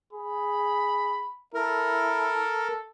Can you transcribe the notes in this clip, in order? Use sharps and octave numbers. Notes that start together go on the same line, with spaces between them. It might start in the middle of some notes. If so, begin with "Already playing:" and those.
G#4 B5
E4 A4 A#4